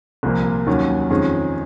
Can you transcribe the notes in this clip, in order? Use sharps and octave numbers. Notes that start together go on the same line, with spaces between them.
C2 A#2 F3 A#3
D#2 D#3 F#3 C#4
F2 D#3 G#3 C#4